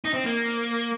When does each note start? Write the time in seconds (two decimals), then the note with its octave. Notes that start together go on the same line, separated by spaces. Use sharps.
0.05 D#4
0.14 C4
0.24 A#3